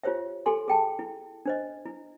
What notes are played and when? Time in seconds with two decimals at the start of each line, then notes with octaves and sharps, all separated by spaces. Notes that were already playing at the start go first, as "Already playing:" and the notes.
0.03 F4 G4 C5 C#5 E5
0.46 G4 A4 G#5 C6
0.68 G#4 G5 A5
0.99 E4
1.46 D4 C5 D#5
1.86 E4